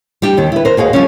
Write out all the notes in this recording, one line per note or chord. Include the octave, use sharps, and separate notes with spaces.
G3 D4 G4
D#2 D#3
E4 B4
A#4 C5
D#2 F#4 G#4 F5
F3 G3 C#4